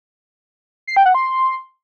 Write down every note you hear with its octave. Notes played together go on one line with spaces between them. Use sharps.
C7
G5
F#5
C6